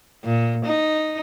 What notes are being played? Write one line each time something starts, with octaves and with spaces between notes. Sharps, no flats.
A#2
D#4